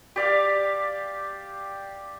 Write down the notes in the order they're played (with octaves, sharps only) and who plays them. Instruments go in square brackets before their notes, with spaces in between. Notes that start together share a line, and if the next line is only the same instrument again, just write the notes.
[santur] G4 D5 F5